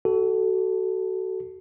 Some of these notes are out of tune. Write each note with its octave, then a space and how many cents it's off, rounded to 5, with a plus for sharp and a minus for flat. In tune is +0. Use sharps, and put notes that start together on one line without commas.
F#4 +30 A4 +0